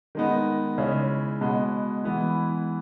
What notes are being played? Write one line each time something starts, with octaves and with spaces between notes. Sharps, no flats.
D#3 G#3 B3 D#4
C#3 G#3 C#4 E4
B2 G#3 B3
E3 G#3 B3 E4